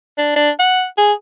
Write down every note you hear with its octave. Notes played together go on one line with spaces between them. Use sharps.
D4
D4
F#5
G#4